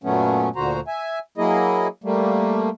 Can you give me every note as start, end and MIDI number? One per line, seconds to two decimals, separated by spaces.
0.04 0.49 42
0.04 0.49 46
0.04 0.49 54
0.04 0.49 57
0.04 0.49 59
0.04 0.49 61
0.56 0.80 38
0.56 0.80 46
0.56 0.80 50
0.56 0.80 66
0.56 0.80 72
0.56 0.80 82
0.87 1.19 76
0.87 1.19 80
1.38 1.87 54
1.38 1.87 58
1.38 1.87 64
1.38 1.87 68
1.38 1.87 75
2.04 2.69 55
2.04 2.69 57
2.04 2.69 58